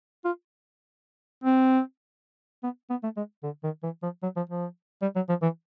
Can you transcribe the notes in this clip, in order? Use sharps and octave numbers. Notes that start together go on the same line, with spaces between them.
F4
C4
B3
B3
A3
G#3
D3
D#3
E3
F3
F#3
F3
F3
G3
F#3
F3
E3